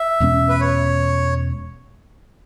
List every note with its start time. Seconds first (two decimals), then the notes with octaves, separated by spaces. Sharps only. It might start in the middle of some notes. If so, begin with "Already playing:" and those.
Already playing: E5
0.20 E2 B2 G#3 C#4
0.49 B4
0.61 C#5